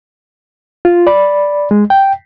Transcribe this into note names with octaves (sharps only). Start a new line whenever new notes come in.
F4
D5 B5
G#3
G5